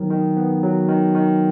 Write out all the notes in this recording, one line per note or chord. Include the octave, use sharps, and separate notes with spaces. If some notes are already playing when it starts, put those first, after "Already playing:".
Already playing: D#3 F#3 B3
D#3
B3
F#3
D#3
D#3